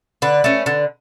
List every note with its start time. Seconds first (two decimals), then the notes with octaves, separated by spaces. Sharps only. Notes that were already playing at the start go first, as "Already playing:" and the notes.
0.22 D3 B4
0.44 A3 C#4
0.66 D3